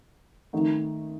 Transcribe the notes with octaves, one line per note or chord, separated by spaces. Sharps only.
D#3 A3 D#4